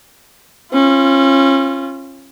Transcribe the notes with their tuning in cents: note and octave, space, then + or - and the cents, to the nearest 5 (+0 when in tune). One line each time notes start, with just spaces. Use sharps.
C#4 -30 F4 -25